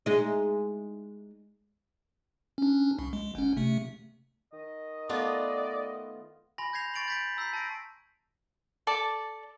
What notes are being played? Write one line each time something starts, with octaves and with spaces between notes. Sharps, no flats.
G#3 D#4
C#4 D4
C2
G#3
G1 C#4
C3 A3
D#3 D#5
A3 B3 F4 D5
G#5 B5 C6 A#6
G6 G#6 A#6 C7 F7
B5 C#6 A6 D7 F7 F#7
G6 B6 D7
A#5 E6 G6 B6 C7
A5 A#6 D7
A4 D5 A5